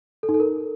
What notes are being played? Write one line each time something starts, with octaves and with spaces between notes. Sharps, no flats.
A4
D#4
A4
A#4